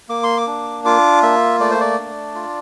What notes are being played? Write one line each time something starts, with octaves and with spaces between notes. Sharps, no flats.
A#3 D6
C6
D6
D4
F4 D6
A#3 E5
A3 D5
C5
D5
D4
F4